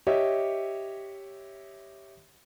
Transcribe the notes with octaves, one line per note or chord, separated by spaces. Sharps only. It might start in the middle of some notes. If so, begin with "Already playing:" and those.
G4 C#5 D#5 E5